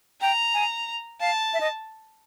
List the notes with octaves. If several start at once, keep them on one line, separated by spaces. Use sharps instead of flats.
G5 A#5
G#5
F5 A5
E5
D#5